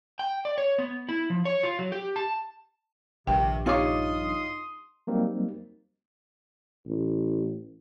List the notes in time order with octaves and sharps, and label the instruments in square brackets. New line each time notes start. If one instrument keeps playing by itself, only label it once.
[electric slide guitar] G5
D5
C#5
B3
E4
F3
C#5
F4
F#3
G4
A5
[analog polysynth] A#1 G2 [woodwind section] C3 D#3 [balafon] G5
[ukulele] D#4 F4 C#5 [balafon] G4 D6 [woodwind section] C6 D#6
[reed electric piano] F#3 G3 A#3 C4 D#4
[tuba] A1